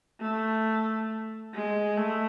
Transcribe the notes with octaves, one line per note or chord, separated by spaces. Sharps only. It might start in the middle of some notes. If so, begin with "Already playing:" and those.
A3
G#3
A3